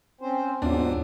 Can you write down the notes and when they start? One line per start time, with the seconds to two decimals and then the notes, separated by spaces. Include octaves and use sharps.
0.21 C4 C#4 C5
0.62 D#2 G#2 F#3 B3 D4 F4